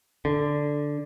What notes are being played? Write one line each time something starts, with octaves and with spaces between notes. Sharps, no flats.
D3